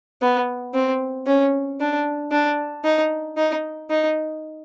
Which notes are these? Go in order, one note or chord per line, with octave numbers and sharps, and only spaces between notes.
B3
C4
C#4
D4
D4
D#4
D#4
D#4